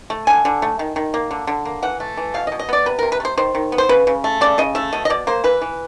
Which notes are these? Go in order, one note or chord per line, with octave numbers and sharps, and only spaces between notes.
A3
D3 G#5
D3
A3
D#3
D#3
A#3
D3
D3
A#3
E3 F#5
A3
E3
B2 F5
D#5
B2
D#5
B3 D5
C3 B4
C3 A#4
B4
A3
C5
D#3 C5
D#3
B3
C5
C#3 B4
C#3
A3
C#3 D5
C#3 D#5
A3 E5
B2 D#5
D#5
B2 D5
A#3 C5
E3 B4
E3